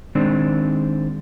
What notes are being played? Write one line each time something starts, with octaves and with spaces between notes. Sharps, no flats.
D#3 G#3 C4 D4